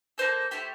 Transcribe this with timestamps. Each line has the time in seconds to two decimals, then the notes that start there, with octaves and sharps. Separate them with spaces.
0.18 A#3 F4 A4 C5
0.51 A3 E4 G4 C5